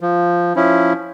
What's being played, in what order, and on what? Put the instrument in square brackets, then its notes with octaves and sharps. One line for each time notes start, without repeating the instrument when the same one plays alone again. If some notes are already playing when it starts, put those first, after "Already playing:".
[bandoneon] F3
F3 C#4 E4